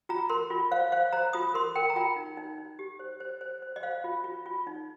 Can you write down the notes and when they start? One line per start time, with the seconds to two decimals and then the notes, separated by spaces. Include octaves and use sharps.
0.09 F4 A#5
0.29 A#4 C6
0.50 F4
0.71 C5 F5
0.92 C5 F5
1.13 C5 A#5
1.33 F4 D#6
1.54 A#4 C6
1.76 A#4 G5
1.90 A#5
1.96 F4 G5
2.16 D#4
2.37 D#4
2.58 D#4
2.79 G4
2.99 C5
3.20 C5
3.41 C5
3.62 C5
3.76 D#5
3.83 C5 F5
4.04 F4
4.24 F4
4.46 F4
4.67 D#4